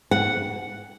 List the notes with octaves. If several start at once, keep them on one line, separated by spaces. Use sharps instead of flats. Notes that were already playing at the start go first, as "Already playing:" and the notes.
F#5